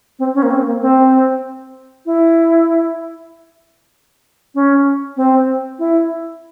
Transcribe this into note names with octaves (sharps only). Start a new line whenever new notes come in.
C4
C#4
A#3
C4
A#3
C4
E4
C#4
C4
E4